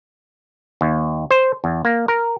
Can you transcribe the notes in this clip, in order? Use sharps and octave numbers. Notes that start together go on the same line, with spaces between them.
D#2
C5
E2
A#3
A#4